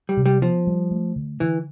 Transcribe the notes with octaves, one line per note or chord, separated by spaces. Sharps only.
G3
C3
G3
F3 B3
G3
A3
D3
D3 E3